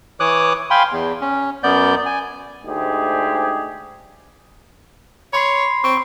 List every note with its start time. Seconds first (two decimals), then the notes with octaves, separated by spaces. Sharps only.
0.20 E3 C#5 D6 D#6 F#6
0.71 F5 G5 G#5 B5 C6
0.91 E2
1.21 C#4
1.63 F#2 B3 D5 G6
2.06 G#5
2.65 D2 G#2 G#3 G4 G#4
5.33 C#5 B5 C6 C7
5.84 C4 C#6